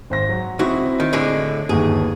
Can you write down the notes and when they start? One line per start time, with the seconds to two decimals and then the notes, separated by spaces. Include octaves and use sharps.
0.10 G#1 C5 A#6
0.29 F#3
0.59 C#2 C4 E4 F#4
1.00 D#3
1.13 A2 D3 G#3
1.69 G1 D#2 G#4